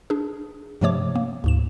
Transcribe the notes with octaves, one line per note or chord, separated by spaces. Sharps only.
D4 G#4
G2 C3 F3 A3 C#5 D6
A#3
D2 G#2 E7